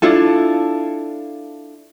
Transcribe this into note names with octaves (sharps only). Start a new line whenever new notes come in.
D4 E4 F4 A4